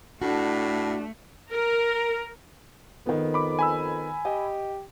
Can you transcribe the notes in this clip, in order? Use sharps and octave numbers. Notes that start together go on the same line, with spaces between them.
A2 A3 D4 F#4
A#4
F2 D#3 B3
B5 D6
G#5 B5 E6
G4 D#5